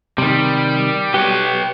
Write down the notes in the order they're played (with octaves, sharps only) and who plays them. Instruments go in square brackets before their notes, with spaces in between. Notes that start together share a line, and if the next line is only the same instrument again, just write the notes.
[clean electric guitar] C3 D#3 [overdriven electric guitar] G3
[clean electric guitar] G4 [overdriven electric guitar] B4 C#5